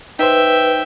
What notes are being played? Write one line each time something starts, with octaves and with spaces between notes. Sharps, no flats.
D#4 B4 C5 E5 G5